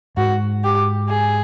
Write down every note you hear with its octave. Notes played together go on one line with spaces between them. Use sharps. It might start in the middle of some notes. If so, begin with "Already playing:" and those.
G#2 F#4
G4
G#4